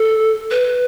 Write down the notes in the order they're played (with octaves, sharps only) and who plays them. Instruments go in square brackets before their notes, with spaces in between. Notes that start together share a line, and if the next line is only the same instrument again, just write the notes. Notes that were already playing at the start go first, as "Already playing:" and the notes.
Already playing: [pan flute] A4
B4